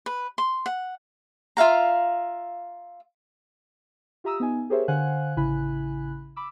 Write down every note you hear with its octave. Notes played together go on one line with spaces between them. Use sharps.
B4
C6
F#5
F4 E5 F5 A#5
F4 G4 E5 A#5 D#6 E6
B3 D#4 G#5
G4 G#4 A#4 C5 C#5 E5
D3 C5 F5 F#5 G#5 F#6
A1 C#3 E4 G#5 B5 F#6
B5 D6 E6